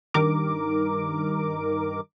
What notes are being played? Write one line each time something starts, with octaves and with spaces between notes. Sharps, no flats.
G2 D#3 A#4 D6